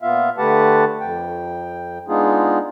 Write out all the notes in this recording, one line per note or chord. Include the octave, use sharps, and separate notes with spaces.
A#2 B3 F4 E5 F5
D3 A3 G4 B4 F#5 A5
F2 G5
G#3 B3 D4 D#4 F4 G#4